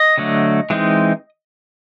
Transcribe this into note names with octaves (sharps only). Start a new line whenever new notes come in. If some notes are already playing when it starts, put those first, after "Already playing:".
Already playing: D#5
D3 F#3 A3
E3 G#3 C4 D#4